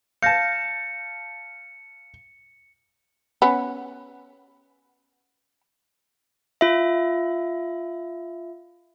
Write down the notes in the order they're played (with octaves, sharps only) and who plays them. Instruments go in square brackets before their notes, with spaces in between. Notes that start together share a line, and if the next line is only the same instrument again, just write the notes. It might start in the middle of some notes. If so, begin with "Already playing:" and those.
[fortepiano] F5 A5 [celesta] G6 A#6 [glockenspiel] C#7
[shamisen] B3 C#4
[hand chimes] F4 E5